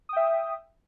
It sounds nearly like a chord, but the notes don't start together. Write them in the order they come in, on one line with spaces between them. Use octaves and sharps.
D#6 G5 E5